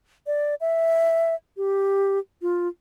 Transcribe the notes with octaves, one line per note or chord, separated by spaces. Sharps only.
D5
E5
G4
F4